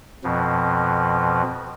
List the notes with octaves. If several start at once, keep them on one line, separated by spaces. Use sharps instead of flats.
F2 B2 F3